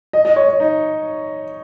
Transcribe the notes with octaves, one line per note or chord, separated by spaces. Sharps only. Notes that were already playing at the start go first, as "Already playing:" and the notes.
D#5
D#5
C#5
C#5
D#4